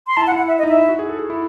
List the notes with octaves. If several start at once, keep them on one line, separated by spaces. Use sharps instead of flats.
C6
E4 A5
F#5
E4
F#5
E5
D#5
D#4
E5
E4
F#4
G#4
A4
G#4
E4